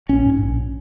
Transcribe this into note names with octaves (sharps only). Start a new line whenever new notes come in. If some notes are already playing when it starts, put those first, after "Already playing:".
A#1 C#4
G#2
A#1